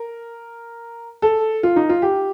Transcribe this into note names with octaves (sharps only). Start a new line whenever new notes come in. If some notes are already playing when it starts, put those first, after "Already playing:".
Already playing: A#4
A4
F4
D#4
F4
G4